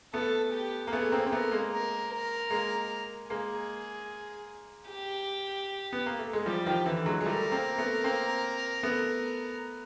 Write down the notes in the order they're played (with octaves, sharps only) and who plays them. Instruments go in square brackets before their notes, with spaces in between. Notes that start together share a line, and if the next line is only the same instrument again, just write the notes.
[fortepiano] A3 B3 [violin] A4
[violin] G4
[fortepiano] A#3
[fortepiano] A3 B3 [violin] G#4
[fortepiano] A#3 C4
C4
[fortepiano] A3 B3 [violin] A#4
[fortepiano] G#3 A#3
[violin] A#4
A#4
[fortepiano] G#3 A#3
[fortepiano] G#3 A#3 [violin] G#4
[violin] G4
[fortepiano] B3
A#3
A3
G#3
[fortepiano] F3 G3 [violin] G4
[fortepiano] D#3 F3
D3 E3
F#3 G#3
G#3
[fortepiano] G3 A3 [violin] A#4
[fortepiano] A#3 C4
A3 B3
A#3 C4
A3 B3